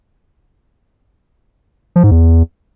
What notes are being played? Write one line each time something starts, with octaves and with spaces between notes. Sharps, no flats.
F3
G#2
E2